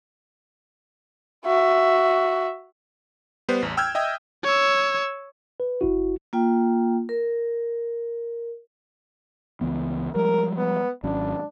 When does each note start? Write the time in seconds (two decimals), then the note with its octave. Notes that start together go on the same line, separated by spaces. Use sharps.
1.45 F#4 E5
3.49 G3 B3 B4 C5
3.62 A1 E2
3.77 G5 E6 F6 G6 G#6
3.95 D#5 E5 G5 D#6
4.44 C#5 E6
5.60 B4
5.81 G1 E4 F#4
6.33 A#3 F4 G5
7.09 A#4
9.61 C#2 E3 B3
10.15 F3 G3 G#3 A#4
10.57 B3
11.04 G#1 F#3 C#4 D4